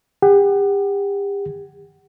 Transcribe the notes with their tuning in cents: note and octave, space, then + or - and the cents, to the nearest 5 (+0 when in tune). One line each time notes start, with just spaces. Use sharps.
G4 +35 F#5 +25